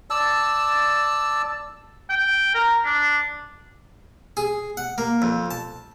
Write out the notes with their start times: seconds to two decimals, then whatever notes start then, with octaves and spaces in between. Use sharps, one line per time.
0.10 D5 A5 E6
2.10 G5
2.54 A#4
2.85 D4
4.37 G#4
4.77 F#5
4.98 A#3
5.22 F2
5.51 A5